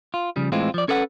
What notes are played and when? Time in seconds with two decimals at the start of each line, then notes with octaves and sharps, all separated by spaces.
0.14 F4
0.36 C#3 F3 G3
0.52 A2 E3 G#3 C4 F4
0.74 F3 D5
0.88 C#4 A4 B4 D5 F#5